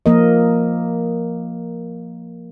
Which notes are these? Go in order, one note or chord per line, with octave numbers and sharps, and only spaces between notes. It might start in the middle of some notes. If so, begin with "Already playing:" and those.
F3 A#3 A#4 D#5